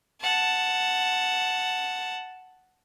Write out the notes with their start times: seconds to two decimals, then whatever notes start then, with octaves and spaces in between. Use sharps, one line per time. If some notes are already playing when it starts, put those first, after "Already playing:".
0.22 F#5 A5